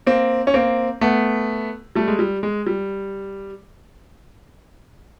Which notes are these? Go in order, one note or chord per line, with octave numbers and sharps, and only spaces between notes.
A#3 C4
C#4
A#3 C4
A3 B3
G3 A3
G#3
G3
G#3
G3